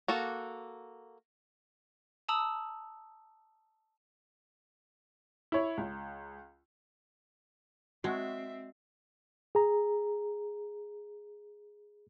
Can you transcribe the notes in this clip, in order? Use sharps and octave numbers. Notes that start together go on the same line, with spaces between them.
A#3 F#4 A4
A5 A#5 D#6 E6 F#7
E4 C#5
C#2
G#3 C4 F#4 E5
G#4 A#5